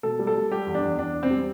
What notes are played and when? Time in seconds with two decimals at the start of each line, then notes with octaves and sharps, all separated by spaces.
0.03 B2 A4
0.19 G3
0.27 A4
0.35 G3
0.51 G3 G4
0.67 E2
0.75 D4
0.83 E2
0.98 E2 D4
1.14 E2
1.23 C4
1.31 G3